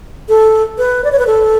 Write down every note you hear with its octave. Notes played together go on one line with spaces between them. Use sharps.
A4
B4
D5
C#5
B4
A4